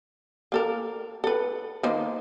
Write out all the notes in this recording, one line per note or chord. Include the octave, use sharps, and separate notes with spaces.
A#3 A4 A#4
A4 B4
D#3 A#3 C5